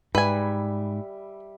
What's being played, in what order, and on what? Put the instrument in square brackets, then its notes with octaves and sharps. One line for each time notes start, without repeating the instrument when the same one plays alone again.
[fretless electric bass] G#2 [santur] G3 E5 [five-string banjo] B4 G#5